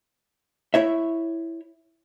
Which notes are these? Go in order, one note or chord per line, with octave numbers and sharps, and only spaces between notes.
E4 C#5 E5